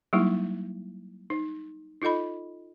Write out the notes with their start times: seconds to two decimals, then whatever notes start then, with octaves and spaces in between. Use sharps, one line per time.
0.13 F#3 G3 A#3 D#4 E4
1.30 D#4
2.02 D#4 F4 A4 D#5 B5